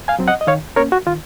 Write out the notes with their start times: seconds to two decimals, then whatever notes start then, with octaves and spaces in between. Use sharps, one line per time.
0.08 F5 G#5
0.19 F#3 C4
0.28 D#5 F#5
0.41 D#5
0.47 D#3 C#5 F5
0.76 A#3 C#4 A#4 C#5
0.92 F#4
1.06 D#3 F4